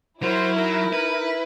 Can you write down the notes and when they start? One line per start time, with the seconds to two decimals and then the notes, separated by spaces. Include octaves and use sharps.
0.22 F#3 E4 A#4 C5
0.56 D#4 A#4
0.93 B4